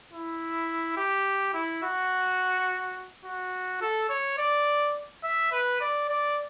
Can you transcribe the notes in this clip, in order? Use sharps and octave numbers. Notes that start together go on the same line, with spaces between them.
E4
G4
E4
F#4
F#4
A4
C#5
D5
E5
B4
D5
D5